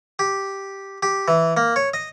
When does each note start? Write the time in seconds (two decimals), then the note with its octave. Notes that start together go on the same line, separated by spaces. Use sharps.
0.19 G4
1.03 G4
1.28 E3
1.57 A#3
1.76 C#5
1.94 D#5